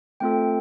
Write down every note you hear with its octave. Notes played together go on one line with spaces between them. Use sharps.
A3 C4 F4 A4 G5